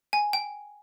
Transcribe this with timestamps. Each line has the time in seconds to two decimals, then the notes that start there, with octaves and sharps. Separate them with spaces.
0.13 G#5
0.33 G5